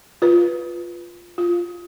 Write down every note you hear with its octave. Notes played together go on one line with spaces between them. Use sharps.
F4 B4
F4